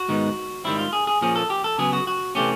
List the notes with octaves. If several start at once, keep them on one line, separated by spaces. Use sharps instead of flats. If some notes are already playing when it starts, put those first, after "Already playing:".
Already playing: F#4
G#2 D#3 G#3 B3 D#4
G#2 D#3 G3 C4 E4
F4
G#4
G#4
A#2 F3 A#3 C#4 G#4
A4
G4
A4
C#3 F#3 B3 G#4
F#4
F#4
C3 E3 A3 C#4 G4